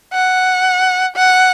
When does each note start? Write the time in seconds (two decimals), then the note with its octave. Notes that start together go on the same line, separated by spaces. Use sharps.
0.14 F#5
1.17 F#5